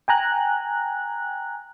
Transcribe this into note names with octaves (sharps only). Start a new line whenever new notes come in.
G5 G#5 A#5 F#6